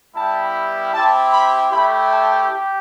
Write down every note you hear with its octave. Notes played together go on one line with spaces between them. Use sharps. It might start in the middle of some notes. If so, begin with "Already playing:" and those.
G3 B3 E4 G4 A5
C4 E4 G4 A5
B5
A3 E4 G4 B5
A5
G4